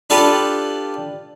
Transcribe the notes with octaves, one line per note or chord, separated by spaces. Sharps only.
D4 F4 G4 A4 B4 F5